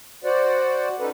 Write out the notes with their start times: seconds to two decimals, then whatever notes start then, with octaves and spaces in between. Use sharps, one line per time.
0.24 F#4 C5 D5 F#5
1.00 C#4 D#4 A4 B4